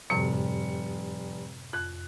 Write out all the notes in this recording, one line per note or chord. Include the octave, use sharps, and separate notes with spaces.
F1 F#2 A2 C3 G3 C#7
F2 F#6